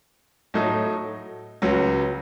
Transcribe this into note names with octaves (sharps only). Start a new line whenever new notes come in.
A2 F#3 A3 D#4
C#2 C#3 F#3